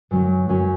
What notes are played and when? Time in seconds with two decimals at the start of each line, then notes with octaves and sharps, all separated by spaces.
0.11 F#2 F#3 C#4
0.49 F#2 F#3 C#4